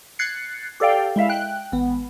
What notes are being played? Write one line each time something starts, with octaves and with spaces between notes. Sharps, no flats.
F#6 G#6 A6 C7 C#7
G4 A4 D5 F5 G5
G#3 E4 E5 F5
G5 F#6
G#1 B3